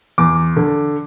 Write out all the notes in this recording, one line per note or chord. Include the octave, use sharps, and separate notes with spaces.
E2 D6
D3